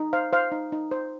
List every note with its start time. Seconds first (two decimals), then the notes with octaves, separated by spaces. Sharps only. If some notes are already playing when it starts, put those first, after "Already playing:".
Already playing: D#4
0.13 C5 F5
0.33 C5 F5
0.52 D#4
0.72 D#4
0.91 C5